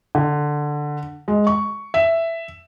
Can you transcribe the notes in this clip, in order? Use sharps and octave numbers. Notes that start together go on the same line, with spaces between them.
D3
G#3
C#6
E5